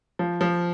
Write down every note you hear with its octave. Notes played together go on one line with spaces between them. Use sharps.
F3
F3